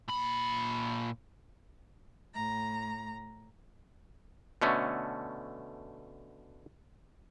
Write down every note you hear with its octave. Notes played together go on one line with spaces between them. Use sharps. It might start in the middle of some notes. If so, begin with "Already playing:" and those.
A#2 B5
A2 A#5
B2 D3 A3 C#4